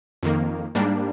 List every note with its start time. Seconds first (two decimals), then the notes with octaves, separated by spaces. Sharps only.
0.23 F2 D#3 A#3
0.75 G#2 G3 A#3 D4